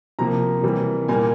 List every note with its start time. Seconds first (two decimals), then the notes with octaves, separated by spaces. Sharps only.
0.19 C3 F3 A#3 A#5
0.63 C3 E3 G3 A#3
1.08 A#2 G3 A#3 G#5